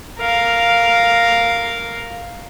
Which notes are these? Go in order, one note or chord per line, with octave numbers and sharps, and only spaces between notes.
A#4 F5